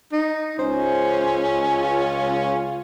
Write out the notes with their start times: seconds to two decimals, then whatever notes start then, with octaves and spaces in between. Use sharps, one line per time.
0.12 D#4
0.59 C#2 C#4 C5
1.79 F4